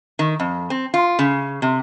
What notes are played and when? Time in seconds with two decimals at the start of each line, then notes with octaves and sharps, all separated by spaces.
0.19 D#3
0.40 F2
0.70 C4
0.94 F4
1.19 C#3
1.62 C3